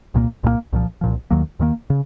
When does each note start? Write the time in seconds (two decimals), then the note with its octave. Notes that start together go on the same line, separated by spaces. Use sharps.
0.14 C2 A#2 F#3 A#3
0.43 C2 A#2 F#3 A#3
0.73 C2 A#2 F3
1.01 C2 A#2 F3
1.31 D#2 D#3 F#3 A#3
1.59 D#2 D#3 F#3 A#3
1.90 C#3